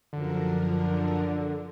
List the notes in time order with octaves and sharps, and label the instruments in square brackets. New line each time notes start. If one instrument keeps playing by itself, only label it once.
[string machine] F#2 F3 A#4 [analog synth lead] D3